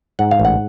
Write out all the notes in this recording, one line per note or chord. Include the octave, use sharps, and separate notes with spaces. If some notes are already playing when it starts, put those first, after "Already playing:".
G#2 F#5
F5
A1
F#5